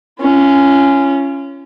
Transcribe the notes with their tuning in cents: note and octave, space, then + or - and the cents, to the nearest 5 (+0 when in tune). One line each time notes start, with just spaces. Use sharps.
C#4 +0 F4 -40